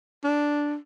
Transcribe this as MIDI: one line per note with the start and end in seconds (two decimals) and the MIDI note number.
0.24 0.76 62